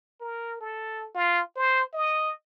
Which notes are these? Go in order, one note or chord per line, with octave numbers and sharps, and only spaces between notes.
A#4
A4
F4
C5
D#5